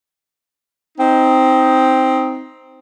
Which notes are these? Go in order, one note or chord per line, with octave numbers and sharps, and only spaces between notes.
C4 D#4